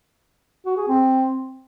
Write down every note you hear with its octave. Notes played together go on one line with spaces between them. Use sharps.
F#4
G#4
C4